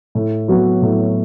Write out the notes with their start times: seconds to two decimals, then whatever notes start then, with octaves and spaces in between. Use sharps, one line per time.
0.15 A2
0.48 F#3 B3 F#4
0.82 A2